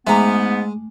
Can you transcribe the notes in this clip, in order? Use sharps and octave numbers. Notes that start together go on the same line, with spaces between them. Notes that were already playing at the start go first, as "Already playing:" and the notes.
G#2 G#3 A3 B3 E5 G#5 A#5 D6